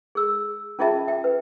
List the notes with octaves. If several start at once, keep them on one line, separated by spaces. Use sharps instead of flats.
G#4 E6
C#4 F4 G#4 D#5 E5 A5
E5 G5
B4